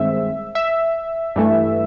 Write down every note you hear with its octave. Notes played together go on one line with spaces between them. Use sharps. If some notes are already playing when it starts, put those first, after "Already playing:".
Already playing: G2 D#3 G#3 C4 E5
E5
G2 E3 A3